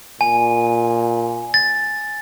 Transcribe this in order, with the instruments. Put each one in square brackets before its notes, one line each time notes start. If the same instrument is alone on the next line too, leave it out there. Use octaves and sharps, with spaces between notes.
[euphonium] A#2 [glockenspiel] G#5
[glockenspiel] A6